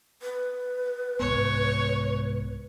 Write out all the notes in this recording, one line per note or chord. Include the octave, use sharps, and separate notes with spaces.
B4
C2 G#2 B3 C#5